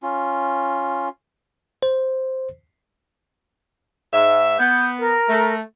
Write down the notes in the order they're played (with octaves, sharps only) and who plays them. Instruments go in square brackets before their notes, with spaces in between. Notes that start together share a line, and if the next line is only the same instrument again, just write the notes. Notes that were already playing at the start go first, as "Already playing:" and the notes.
[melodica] C#4 F4
[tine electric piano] C5
[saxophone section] G#2 E5
[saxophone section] B3 [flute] G6
[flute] A#4
[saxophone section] A3